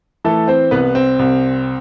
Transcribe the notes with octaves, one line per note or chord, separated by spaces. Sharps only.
E3 A3 A4
C4 C5
C2 B3 B4
C4
C2